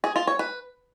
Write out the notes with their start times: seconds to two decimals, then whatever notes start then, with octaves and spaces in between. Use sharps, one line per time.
0.04 G#4
0.16 F4
0.27 C#5
0.39 B4